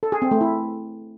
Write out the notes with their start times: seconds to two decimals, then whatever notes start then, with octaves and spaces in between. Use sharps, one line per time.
0.03 A4
0.12 G#4
0.22 C4
0.31 A3
0.41 E4